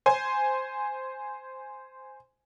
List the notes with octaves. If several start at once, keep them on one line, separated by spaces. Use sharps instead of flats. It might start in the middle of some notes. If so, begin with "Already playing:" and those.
C5 G#5